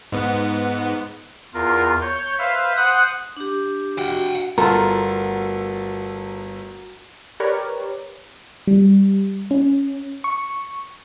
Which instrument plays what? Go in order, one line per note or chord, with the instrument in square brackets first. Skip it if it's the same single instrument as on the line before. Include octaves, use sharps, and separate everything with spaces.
[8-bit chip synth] G#2 B3
[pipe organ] E2 F4 A#4
C#5 G6
B4 C5 E5 F5
C5 F#5 D#6 F#6
[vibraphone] D4 G4
[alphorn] F#4 [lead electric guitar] F#5 G5
[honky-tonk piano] G1 A4 [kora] A3 F4 [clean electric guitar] F#4 A#4
[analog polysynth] G4 A#4 B4 C#5 D5
[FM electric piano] G3
C#4
C#6